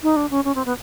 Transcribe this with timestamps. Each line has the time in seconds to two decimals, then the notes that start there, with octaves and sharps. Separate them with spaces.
0.03 D#4
0.16 D4
0.31 C#4
0.44 C#4
0.55 C4
0.65 B3